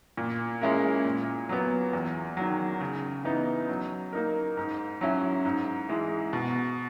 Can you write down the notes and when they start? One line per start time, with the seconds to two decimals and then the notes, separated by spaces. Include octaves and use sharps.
0.17 A#2
0.62 G#3 C#4 E4 A#4
1.05 A#2
1.49 F#3 B3
1.93 E2
2.37 D#3 F#3
2.80 C#3
3.24 E3 B3 D#4
3.69 F#3
4.13 A#3 D#4 A#4
4.57 G#2
5.01 F#3 C#4 E4
5.45 G#2
5.89 E3 G#3
6.33 B2